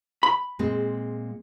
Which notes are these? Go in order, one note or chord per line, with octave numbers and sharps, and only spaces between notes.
B5
A#2 G#3 C4